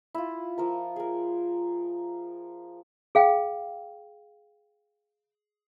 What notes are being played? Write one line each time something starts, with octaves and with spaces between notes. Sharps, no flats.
E4 F4
F3 A#4 A#5
G#4 A#4
G#4 F5 G5